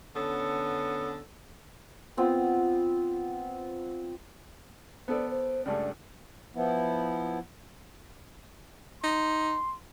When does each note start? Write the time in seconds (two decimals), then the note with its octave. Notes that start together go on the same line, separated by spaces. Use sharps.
0.16 D3 B3 C#4 A4
2.17 B3 C4 F4
5.08 B3 A4 C5 D5
5.30 C5
5.66 C#2 G2 A3 D5
6.55 F3 B3 E4
9.03 D#4 C6